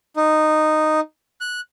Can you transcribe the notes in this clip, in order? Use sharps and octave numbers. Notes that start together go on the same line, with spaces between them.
D#4
F#6